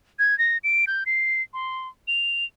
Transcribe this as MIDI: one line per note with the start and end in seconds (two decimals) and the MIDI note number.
0.19 0.37 92
0.39 0.58 94
0.64 0.85 98
0.87 1.04 91
1.06 1.42 96
1.53 1.88 84
2.08 2.45 101